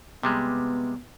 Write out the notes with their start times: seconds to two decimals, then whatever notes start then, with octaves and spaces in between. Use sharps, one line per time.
0.23 C3 G3 G#3 B3